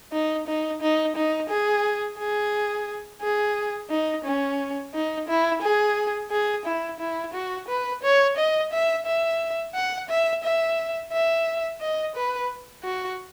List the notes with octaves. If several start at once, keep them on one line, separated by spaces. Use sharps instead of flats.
D#4
D#4
D#4
D#4
G#4
G#4
G#4
D#4
C#4
D#4
E4
G#4
G#4
E4
E4
F#4
B4
C#5
D#5
E5
E5
F#5
E5
E5
E5
D#5
B4
F#4